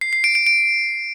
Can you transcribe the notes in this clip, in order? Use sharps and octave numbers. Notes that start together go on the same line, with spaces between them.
C7
C7
D7
D7
D7